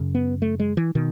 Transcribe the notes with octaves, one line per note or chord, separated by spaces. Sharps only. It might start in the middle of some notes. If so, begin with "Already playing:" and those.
Already playing: F#2 C#3
B3
A3
G#3
E3
B2 D#3